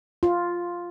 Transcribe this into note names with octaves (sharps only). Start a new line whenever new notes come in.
F4